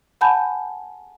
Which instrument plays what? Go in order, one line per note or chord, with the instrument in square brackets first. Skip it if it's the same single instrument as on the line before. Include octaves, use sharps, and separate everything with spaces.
[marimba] F#5 G#5 A5 B5 G6